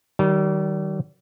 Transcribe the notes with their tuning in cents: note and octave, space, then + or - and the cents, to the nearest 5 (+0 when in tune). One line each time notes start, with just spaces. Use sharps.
D#3 +0 G3 -35